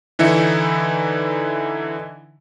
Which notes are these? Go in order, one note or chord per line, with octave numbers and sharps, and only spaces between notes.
D3 E3 D#4 E4 E5 C#7